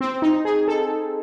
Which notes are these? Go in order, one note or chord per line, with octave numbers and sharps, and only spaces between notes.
C4
D#4
G#4
A4